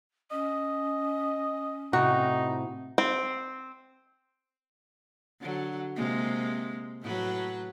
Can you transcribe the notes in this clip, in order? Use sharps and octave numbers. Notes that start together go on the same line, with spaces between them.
C#4 D#5
A2 C3 D#4 F#4
C4
D3 F#3
C3 G#3 A#3
A2 F#3 B4